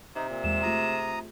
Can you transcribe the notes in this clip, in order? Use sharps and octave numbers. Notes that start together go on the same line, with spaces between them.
C3 D#4
A#2
E2 G#3 E7
A3 F4 G#4 A#5 D#6